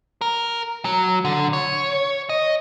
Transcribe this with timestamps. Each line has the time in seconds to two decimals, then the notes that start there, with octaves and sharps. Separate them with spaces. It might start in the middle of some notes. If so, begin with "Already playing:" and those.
0.21 A#4
0.85 F#3
1.25 D3
1.53 C#5
2.29 D#5